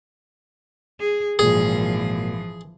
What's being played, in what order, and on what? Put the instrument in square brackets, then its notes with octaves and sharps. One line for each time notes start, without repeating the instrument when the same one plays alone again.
[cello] G#4
[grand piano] G#1 A#2 [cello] E3 F3 [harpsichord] G#4